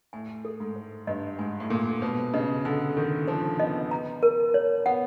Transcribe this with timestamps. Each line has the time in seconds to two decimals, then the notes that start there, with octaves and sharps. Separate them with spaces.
0.13 A2 G#5
0.45 A4
0.60 G#2
0.76 C5
1.07 G2 D#5
1.39 G#2 G#5
1.60 A2
1.70 A#2 A4
2.02 B2 C5
2.34 C#3 D#5
2.65 D3 G#5
2.97 D#3 A4
3.28 F3 C5
3.60 B3 D#5
3.91 A#5
4.23 A#4
4.54 C#5
4.86 B3 F#5